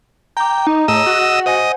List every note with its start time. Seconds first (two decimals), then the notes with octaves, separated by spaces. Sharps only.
0.37 G5 A#5 D6
0.67 D#4 A#5
0.88 A2 G#4 D#5 E6
1.06 F#4
1.46 C5 D#5 F#5 G#5